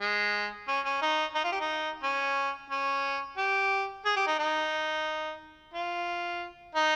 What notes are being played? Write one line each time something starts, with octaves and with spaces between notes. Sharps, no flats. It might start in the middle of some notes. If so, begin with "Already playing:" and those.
G#3
C#4
C#4
D#4
D#4
F4
G4
D#4
C#4
C#4
G4
G#4
G4
D#4
D#4
F4
D#4